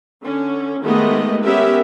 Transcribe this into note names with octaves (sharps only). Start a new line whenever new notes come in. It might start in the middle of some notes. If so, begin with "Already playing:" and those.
D3 C#4
D#3 G#3 A3 B3 G4 D#5
B3 C#4 G4 A#4 E5